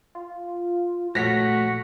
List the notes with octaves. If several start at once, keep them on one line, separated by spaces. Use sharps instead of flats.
F4
A#1 A3 F#4 C#5 A#6 B6